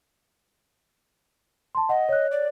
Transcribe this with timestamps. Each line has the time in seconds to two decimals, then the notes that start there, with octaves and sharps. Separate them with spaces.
1.75 A5 C6
1.89 D#5 F#5
2.09 C#5 F#6
2.31 D5